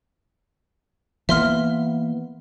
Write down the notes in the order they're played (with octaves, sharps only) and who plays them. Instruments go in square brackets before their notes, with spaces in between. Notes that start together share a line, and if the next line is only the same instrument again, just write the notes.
[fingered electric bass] E3 A#3 B3 [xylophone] E5 C6 F6